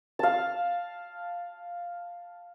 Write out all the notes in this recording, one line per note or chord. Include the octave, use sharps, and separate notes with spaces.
F5 A5